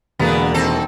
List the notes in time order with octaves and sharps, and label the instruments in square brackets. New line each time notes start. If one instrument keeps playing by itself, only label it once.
[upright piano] E1 A#3 G#4 [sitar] D3 B3
[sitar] D#3 C4 A4